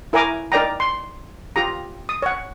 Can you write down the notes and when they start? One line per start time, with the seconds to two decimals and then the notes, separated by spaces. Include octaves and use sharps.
0.13 E4 A#4 C#5 G#5 A#5 D6
0.52 D#4 A#4 D5 G5 A#5
0.80 C6
1.56 F4 G4 A#5
2.09 D#6
2.22 C#5 F#5